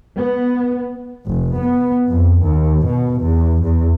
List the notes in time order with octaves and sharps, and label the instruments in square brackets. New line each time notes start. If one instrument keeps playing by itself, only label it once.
[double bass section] B3
F1
B3
F2
D#2
B2
E2
E2